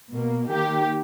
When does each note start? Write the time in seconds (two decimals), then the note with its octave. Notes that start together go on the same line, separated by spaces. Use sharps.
0.12 B2 A#3
0.50 D#3 A#3 G4